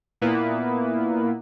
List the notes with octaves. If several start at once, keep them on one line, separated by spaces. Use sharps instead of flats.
A#2 A#3 B3 E4 B4